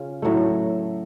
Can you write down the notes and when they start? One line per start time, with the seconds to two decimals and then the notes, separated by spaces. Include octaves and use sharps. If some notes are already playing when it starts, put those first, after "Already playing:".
Already playing: C#3 C#4 F4
0.22 A2 F#3 A3